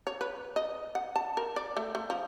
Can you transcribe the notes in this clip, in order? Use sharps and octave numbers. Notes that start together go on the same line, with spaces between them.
C#5
B4
D#5
F#5
A5
A#4
D5
A3
A3
F3